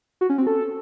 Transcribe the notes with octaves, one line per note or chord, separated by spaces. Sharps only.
F#4
C#4
C4
A4